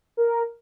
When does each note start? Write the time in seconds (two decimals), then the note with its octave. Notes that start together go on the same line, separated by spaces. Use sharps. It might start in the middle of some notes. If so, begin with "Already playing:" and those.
0.17 A#4